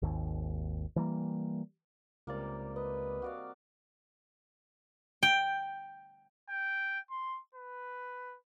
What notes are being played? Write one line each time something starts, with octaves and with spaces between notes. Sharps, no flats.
G#1 D#2
E3 G3 A#3
C#2 C3 G3 A#3 D5
B4 D#5
F#4 D5 F5
G5
G5
C6
B4